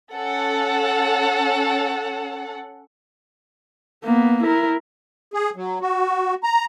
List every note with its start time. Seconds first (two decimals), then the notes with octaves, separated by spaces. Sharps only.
0.14 C#4 A4 F#5
4.04 A#3 B3
4.43 E4 A#4
5.33 G#4
5.56 F#3
5.81 F#4
6.43 A#5